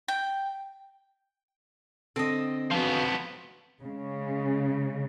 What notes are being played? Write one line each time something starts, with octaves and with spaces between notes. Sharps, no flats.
G5
D3 C4 A4 D#5
F3 B3 F#4 B4 F5
C#3 G#3